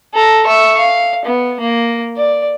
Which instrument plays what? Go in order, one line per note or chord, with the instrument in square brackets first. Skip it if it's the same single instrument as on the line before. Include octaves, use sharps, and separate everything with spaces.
[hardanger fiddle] A4 A#5
E5 C#6
F5
B3
A#3
D5